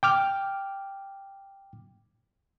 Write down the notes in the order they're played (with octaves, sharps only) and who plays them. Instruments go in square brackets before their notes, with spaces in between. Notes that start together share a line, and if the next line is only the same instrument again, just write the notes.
[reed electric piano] G5 D6 F6